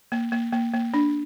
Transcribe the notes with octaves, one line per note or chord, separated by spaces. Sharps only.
A#3
A#3
A#3
A#3
D4